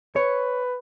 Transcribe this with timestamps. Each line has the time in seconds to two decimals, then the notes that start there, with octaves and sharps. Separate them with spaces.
0.16 B4 C#5